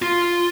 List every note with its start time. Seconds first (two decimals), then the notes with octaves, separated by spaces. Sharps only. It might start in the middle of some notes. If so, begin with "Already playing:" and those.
0.02 F4